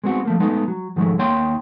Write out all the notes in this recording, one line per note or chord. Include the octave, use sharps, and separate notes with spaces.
G#3 B3 C4 F#4
F3 A3 A#3
G#3 A3 B3 D#4
F#3
G#2 D#3 F3 F#3 G#3 A3
D#2 D#3 A#3 C#5 G5 C6